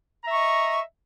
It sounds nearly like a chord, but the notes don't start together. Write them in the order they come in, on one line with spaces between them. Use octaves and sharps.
A#5 E5 C#6 D#5